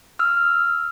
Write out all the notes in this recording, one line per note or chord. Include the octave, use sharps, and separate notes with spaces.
E6 F6